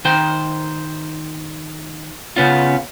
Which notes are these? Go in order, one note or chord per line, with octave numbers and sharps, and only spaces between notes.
D#3 C5 G5
C#3 B3 C#4 F4